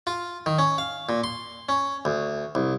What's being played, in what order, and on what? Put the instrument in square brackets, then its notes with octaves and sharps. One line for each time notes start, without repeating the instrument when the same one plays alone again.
[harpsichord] F4
D#3
C#4
F5
A#2
C6
C#4
D2
C2